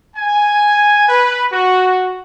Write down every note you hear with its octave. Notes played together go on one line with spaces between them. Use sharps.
G#5
B4
F#4